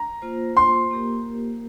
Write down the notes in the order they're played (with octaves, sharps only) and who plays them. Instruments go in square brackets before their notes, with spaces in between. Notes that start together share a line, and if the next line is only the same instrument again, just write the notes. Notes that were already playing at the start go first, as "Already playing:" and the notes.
Already playing: [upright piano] A#5
[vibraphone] A#3 F4 C5
[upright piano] C6
[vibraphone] A#3 G4 A#4